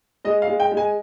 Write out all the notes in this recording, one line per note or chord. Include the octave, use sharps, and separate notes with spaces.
G#3 D#5
F5
G#3
G5
G#3
G#5